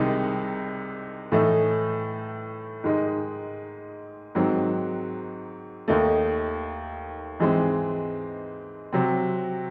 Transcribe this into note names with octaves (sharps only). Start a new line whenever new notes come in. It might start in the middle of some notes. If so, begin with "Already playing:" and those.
Already playing: C2 C3 D#3 G#3 D#4
A2 E3 A3 D#4
G#2 D#3 G#3 D#4
G#2 D#3 F#3 C4
D#2 D#3 A3 D#4
G#2 E3 G#3 C4
C3 F#3 C4